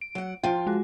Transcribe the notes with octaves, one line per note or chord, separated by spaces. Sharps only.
D7
F#3 F#5
F3 F4 G5
G#3 F#4